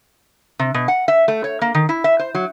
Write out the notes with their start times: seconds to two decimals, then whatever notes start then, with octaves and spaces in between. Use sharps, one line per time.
0.59 C3
0.74 B2
0.88 F#5
1.08 E5
1.28 A3
1.44 C#5
1.62 A#3
1.75 D#3
1.89 E4
2.04 E5
2.19 C5
2.35 F#3